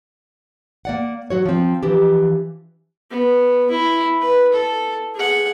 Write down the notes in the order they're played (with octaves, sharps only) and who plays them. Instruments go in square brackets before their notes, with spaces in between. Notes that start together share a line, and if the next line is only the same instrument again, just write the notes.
[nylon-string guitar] A#3 D5 F#5
F#3 F#4 C#5
F3 C4
E3 F3 D4 G4
[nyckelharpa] B3
E4
B4
A4
G#4 F#5